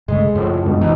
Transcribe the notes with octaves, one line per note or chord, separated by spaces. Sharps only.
G2 C#3 G#3 A3
F#2 A2 F3
C#2 G2 B2
G#2 B2 E3 D#4